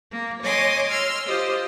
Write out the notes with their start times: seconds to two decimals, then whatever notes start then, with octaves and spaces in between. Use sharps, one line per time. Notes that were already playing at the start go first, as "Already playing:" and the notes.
0.12 A#3
0.43 C#5 D#5 G#5 C6 D6 D#6
0.90 C6 E6 F6
1.26 F4 G4 C5 D#5